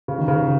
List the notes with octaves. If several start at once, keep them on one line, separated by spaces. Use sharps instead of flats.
C#3
D#3
C#3